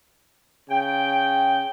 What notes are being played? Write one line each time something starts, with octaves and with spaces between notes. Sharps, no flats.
C#3 G5